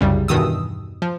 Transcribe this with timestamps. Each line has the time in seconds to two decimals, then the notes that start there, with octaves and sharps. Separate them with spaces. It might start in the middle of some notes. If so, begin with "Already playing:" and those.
0.01 C2 F#2 C#3 G3
0.28 E2 G2 B2 D#3 D#6 E6
1.02 F3